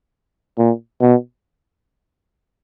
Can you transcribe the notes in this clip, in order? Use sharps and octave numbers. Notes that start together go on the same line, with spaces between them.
A#2
B2